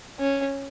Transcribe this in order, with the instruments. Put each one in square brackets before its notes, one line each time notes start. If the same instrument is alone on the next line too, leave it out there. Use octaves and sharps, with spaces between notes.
[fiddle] C#4